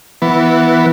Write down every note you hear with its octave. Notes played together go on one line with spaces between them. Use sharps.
E3 B3